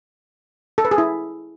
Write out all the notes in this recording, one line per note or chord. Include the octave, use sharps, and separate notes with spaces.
A4
B4
G#4
E4